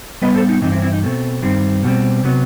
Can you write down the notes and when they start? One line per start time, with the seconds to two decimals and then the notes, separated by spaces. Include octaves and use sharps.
0.22 A2 G3 B3 B4 D#5
0.35 A4 C5
0.49 D#4
0.62 G2 E3 C4 D#4
0.72 C4 E4
0.82 C4 E4
0.92 D#4
1.02 B2 A3 C4
1.42 G2 D#3 G3 C4
1.83 B2 G3 C4
2.23 C3 F#3 B3